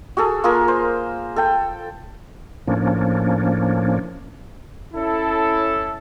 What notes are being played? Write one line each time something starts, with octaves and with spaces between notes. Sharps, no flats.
F#4 G#4 A4
A#3 F4 G#4 A#4
C5
A4 G5
A2 F3 A#3 C#4 D4
C#4 E4 A4